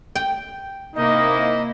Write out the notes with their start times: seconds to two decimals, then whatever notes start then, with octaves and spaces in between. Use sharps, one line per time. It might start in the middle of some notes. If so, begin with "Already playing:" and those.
0.15 G5
0.96 C3 A#3 D#4 E4 D#5